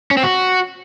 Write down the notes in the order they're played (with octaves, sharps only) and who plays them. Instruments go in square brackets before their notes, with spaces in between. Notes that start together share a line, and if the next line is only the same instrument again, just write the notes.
[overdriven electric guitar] C#4
C4
F#4